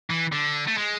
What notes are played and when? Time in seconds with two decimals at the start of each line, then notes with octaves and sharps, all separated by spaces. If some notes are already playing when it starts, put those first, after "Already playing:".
0.10 E3
0.33 D3
0.68 A3
0.78 G#3